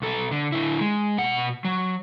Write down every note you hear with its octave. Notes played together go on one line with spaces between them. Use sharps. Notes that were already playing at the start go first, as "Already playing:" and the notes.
B1 A4
D3
D3 E4
G#3
B2 F#5
F#3